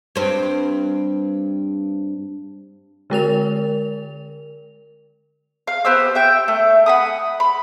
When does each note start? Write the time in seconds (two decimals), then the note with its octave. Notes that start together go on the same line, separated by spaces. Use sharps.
0.16 G2 C4
3.10 D3 G#3 A#4 F7
5.67 F5
5.85 B3 G4 C5 E6
6.15 E5 G5
6.48 A3
6.86 F#5 B5 D#6
7.40 B5